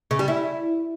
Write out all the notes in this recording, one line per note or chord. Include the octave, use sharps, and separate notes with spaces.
C#3
G3
E4